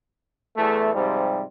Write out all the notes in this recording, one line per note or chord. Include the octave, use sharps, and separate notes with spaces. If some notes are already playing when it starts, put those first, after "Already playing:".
E2 A3
G#2 C3 F3 G3